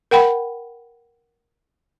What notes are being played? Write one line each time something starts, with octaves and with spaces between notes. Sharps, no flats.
A#4 F#5 G5 B5